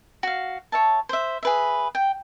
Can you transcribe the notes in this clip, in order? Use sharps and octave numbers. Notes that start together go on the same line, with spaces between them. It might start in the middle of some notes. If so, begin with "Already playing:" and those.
F#4 F5
C#5 E5 A5
C5 E5
G#4 B4 E5
G5